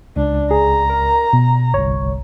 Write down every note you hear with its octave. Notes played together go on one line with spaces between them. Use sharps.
C#2 D4
G#4 A#5
A#4
B2
G1 C2 C#5